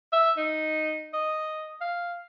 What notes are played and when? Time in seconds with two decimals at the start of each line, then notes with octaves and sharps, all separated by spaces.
0.13 E5
0.37 D#4
1.13 D#5
1.81 F5